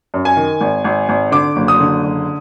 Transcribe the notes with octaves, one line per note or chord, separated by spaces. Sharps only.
F#2
G#5
D#3
G#1
G#1
G#1
D3 D6
F#1
D#6
D3
F#1